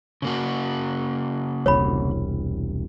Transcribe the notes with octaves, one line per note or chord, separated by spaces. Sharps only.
C#3 A#3 F#4
E1 C2 C#5 B5